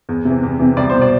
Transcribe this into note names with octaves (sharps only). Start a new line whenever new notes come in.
E2
C3 E3
E2
C3 E3
C2 D5
B2 C5
D5